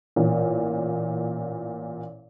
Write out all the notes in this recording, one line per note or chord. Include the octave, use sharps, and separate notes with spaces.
A1 A#2